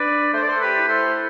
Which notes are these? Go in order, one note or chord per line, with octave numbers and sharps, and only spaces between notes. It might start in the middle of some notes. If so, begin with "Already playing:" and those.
Already playing: D4 B4 D5
A3 C5
D5
A4 C5
G4 B4
E4
A4 C5